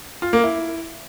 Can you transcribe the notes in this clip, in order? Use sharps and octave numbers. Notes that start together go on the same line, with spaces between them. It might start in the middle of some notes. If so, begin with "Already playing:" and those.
F4
A#3
E4